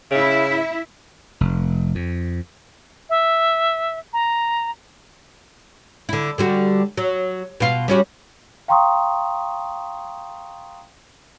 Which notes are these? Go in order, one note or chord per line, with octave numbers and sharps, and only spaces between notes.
C#3 E4 E5
F1
F2
E5
A#5
D3 E4
D3 G3 F#4
F#3
B2 F4
G3 C#4 F#4
F5 G5 A#5 C6 C#6 D#6